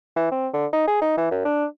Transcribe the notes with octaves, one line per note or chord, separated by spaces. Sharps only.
E3
C4
D3
D#4
G#4
D#4
E3
F#2
D4